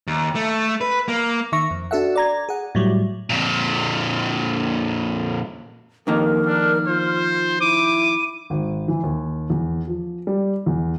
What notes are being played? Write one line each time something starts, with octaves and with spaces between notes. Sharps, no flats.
D#2
A3
B4
A#3
D#3 E5 C#6 A#6
F2
D4 F#4 A4 E5 F#5
D5 A#5 G#6
G#4 F#5
A2 F#3 G3
F2 A#2
F2 D#3 A#3 A#4
D4 F6
F4 C5
E4 D6 D#7
G#1
E3
D#2
E2
F3
G3
E2